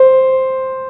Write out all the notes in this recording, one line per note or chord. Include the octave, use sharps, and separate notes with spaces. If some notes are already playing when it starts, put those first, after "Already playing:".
Already playing: C5